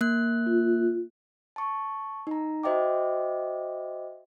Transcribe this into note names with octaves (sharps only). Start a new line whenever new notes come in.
A#3 F#6
F4
A5 C#6
D#4 A#5
F#4 C5 D#5 E5 G5 D6